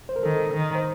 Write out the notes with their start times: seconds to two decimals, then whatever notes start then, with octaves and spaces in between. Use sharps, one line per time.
0.09 C5
0.16 A#4
0.23 D#3 A4
0.53 D#3
0.75 C5